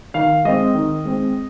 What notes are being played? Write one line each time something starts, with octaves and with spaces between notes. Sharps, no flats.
D#3 F5
G#3 C4 D#5
D#3
G#3 C4